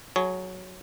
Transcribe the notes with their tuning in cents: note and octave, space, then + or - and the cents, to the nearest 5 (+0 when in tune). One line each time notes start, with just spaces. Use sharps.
F#3 +0 G#4 +35 C#5 +0